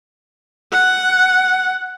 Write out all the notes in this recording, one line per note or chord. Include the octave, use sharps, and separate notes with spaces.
F#5